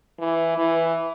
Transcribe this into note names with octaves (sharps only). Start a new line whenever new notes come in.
E3
E3